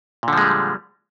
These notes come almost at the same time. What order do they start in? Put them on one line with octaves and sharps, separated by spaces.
A#2 D3 F3 G#3 G3